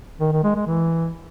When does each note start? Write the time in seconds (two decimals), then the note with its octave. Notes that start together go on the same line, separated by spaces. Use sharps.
0.21 D#3
0.32 D#3
0.44 G#3
0.55 G#3
0.67 E3